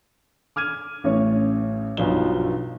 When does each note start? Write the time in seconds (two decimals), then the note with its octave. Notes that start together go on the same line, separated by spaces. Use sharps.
0.56 D6 F6 G#6 D#7
1.04 A1 A2 C#4 C#5
1.97 B1 G2 F3 F#3 D#4 G7